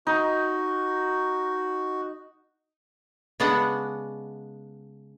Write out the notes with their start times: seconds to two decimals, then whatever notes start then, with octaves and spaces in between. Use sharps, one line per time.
0.07 D#4 F#4
3.40 C#3 G#3 B3 D4 F#5